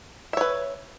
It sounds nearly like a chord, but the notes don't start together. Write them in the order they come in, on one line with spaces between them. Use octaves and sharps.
E5 C#5 B4